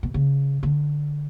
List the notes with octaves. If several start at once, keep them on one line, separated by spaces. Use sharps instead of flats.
B2
C#3
D3